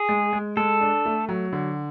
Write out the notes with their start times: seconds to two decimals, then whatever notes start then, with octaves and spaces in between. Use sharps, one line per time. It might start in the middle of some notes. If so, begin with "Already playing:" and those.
Already playing: G#4
0.09 G#3
0.33 G#3
0.57 G#3 A4
0.81 D4
1.05 A3
1.29 F#3
1.53 D3